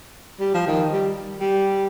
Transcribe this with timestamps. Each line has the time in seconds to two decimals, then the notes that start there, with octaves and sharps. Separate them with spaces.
0.40 G3
0.54 F3
0.67 D#3
0.93 G3
1.41 G3